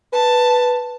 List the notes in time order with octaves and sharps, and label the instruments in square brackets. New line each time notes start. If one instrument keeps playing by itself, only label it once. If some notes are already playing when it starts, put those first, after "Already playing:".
[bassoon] B4 [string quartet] A5